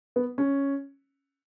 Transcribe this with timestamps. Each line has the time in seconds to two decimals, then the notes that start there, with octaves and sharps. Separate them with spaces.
0.16 B3
0.38 C#4